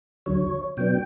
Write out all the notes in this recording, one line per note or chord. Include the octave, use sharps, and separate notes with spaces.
D2 D3 F#3 C#5
B2 F#3 B3 D4 G5